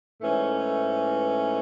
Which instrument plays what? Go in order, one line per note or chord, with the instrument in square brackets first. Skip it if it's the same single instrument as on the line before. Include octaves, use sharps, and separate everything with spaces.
[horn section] G#2 E3 A3 C#4